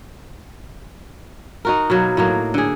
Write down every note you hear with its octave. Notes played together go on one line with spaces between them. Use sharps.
D#4 F#4 A#4
B2 F#3 A#3
A2 F#3 A#3
D3 G#4